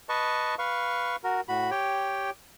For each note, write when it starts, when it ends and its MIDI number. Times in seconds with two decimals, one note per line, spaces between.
0.09 0.55 71
0.09 0.55 75
0.09 0.55 81
0.09 0.55 85
0.59 1.16 71
0.59 1.16 77
0.59 1.16 85
1.24 1.41 66
1.24 1.41 70
1.48 1.70 45
1.48 1.70 66
1.48 1.70 83
1.71 2.30 67
1.71 2.30 73
1.71 2.30 79